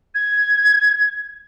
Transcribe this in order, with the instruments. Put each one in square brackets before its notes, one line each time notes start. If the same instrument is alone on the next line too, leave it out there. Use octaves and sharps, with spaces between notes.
[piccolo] G#6